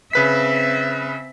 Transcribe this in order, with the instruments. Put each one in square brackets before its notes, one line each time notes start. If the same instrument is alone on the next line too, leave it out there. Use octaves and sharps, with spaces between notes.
[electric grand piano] C#3 B4 B6 [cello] C4 E5